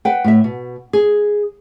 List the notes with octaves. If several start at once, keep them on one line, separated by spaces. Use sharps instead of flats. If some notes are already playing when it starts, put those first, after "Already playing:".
B4 F#5 G5
A2 E5
B2
G#4